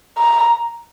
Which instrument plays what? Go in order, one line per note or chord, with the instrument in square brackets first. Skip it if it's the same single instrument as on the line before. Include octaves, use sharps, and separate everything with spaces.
[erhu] A#5